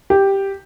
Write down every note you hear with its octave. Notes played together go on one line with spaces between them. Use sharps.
G4